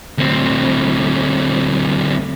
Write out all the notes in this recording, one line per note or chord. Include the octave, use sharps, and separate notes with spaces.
D2 C4